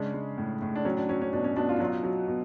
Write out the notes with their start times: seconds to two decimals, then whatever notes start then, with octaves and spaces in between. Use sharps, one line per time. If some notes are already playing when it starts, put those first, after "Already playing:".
Already playing: C#3 G#3 D4
0.14 G#3
0.38 A2
0.62 A2
0.75 D4
0.85 F#3 C#4
0.97 D4
1.09 F#3 C#4
1.21 C#4
1.33 B2 D4
1.44 C#4
1.56 B2 D4
1.69 F4
1.76 D4
1.80 F#3 F4
2.04 F#3
2.28 B2